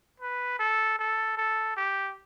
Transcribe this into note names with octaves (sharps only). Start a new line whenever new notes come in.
B4
A4
A4
A4
G4